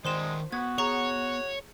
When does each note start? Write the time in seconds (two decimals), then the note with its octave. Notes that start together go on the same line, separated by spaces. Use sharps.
0.05 D#3 G#3 C5 D5 G5 C6 E7
0.52 B3 F#4 G#6
0.78 G#4 C#5 A#5 C#6